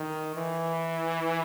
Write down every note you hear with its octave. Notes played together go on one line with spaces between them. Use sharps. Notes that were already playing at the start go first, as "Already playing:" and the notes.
Already playing: D#3
E3